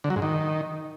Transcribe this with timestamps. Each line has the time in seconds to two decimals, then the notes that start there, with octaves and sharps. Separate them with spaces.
0.04 D3
0.10 F#3
0.16 G#2
0.22 D#3